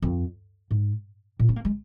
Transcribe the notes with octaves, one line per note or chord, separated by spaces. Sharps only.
F2
G#2
A#2
C#4
A#3
G#3